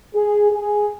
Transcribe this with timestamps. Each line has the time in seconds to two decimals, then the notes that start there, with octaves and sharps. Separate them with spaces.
0.14 G#4
0.51 G#4